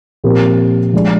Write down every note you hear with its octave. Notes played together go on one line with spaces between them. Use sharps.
A#2 F3 C4 G4 A#4
F3 G#3 D4 G#4 D5